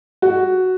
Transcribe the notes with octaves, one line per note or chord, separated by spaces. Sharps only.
F#4